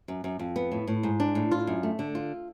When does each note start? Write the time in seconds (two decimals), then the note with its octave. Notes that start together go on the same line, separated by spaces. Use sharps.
0.08 F#2
0.24 F#2
0.39 F2
0.56 B3
0.72 A2
0.88 A2
1.03 G#2
1.20 D4
1.35 A2
1.51 F4
1.67 F#2
1.83 A3
1.99 D3
2.15 F4